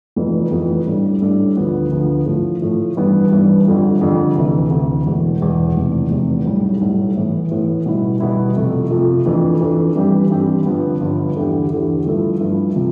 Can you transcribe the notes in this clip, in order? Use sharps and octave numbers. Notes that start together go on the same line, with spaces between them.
F1 F2 E3 B3
F1 F2 E3 B3
A2 G3 D4 A4
A2 G3 D4 A4
D2 D3 F3 B3
D2 D3 F3 B3
A2 F3 A3
A2 F3 A3
G2 E3 G3 B3
G2 E3 G3 B3
G1 F2 D3 G3
G1 F2 D3 G3
D2 C3 E3
D2 C3 E3
E1 E2 B2
E1 E2 B2
F1 E2 C3
F1 E2 C3
B1 A2 G3
B1 A2 G3
A2 E3 B3
A2 E3 B3
B2 G3 B3 E4
B2 G3 B3 E4
F2 C3 F3 A3
F2 C3 F3 A3
F2 E3 A3 D4 A4
F2 E3 A3 D4 A4
G2 E3 G3 C4 G4
G2 E3 G3 C4 G4
G1 G2 F3 B3
G1 G2 F3 B3
E2 D3 A3 E4 G4
E2 D3 A3 E4 G4
G2 F3 A3 E4 A4
G2 F3 A3 E4 A4
C3 F3